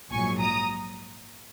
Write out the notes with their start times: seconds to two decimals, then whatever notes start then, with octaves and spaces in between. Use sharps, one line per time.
0.11 A#1 G#2 F#3 G#5 C#6
0.39 A#5 D#6